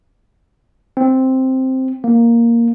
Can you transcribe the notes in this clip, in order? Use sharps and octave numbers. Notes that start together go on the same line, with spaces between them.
C4
A#3